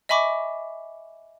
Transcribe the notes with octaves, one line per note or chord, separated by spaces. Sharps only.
D#5 E5 G#5 B5 C#6 D6